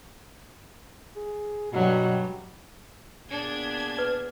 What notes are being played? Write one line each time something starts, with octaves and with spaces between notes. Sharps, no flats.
G#4
G2 B2 F#3 G3
A#2 B3 D4 G#4 G#6
B4